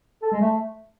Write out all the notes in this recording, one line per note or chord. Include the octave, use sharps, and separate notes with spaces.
A4
G#3
A3